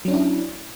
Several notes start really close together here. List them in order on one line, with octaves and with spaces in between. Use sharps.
F#3 C#4 D4 E4